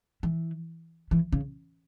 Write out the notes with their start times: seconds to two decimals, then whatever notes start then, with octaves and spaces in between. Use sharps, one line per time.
0.23 E3
1.11 E3
1.33 C#3